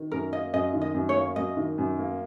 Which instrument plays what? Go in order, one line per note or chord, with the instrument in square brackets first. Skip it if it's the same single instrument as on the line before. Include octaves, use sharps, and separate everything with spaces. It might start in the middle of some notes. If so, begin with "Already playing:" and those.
Already playing: [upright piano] D#3
[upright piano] F#2 [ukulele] A#4
[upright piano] A#3 [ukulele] D#5
[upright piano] F#2 [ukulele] D#5
[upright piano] D#3
[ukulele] D#5
[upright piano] F#2
[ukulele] C#5
[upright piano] A#3
[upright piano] F#2 [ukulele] D#5
[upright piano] D#3
F#2
A#3